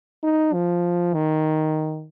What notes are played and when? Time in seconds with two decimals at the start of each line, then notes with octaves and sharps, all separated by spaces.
0.23 D#4
0.53 F3
1.14 D#3